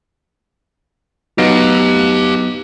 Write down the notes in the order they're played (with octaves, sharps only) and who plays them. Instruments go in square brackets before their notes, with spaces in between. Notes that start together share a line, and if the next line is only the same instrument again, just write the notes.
[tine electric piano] F#3 B3 D#4 [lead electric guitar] G4 F5